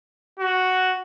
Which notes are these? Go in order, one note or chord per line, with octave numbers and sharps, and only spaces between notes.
F#4